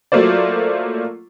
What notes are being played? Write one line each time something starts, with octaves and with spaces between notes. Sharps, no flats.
F#3 A3 A#3 F4 C5 D5